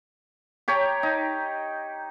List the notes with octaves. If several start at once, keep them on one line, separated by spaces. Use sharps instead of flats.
G4 C#5 G5 A#5
D#4